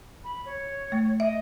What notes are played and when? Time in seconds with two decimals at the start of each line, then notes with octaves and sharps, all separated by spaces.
0.24 B5
0.46 C#5
0.92 A3
1.20 D#5 E5